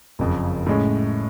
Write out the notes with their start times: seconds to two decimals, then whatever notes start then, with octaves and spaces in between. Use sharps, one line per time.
0.19 F#1 F2 C#3
0.66 A2 G#3 C#4